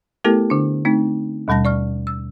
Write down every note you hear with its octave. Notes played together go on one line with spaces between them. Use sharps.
A3 B3 E4 G4 A4 A#4
D3 D4
A3 C4 D#4
D#2 B2 G3 A5 A#6
D5 C#6 F6
E6